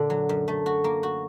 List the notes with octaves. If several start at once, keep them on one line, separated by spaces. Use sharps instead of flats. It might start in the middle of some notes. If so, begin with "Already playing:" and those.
Already playing: A#2 D3 D4
F#3
F#2
A3
F#4
A#3
F#4